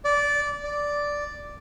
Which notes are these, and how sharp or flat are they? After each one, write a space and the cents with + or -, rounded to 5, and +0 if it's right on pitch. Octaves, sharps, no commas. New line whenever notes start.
D5 -15
D5 -5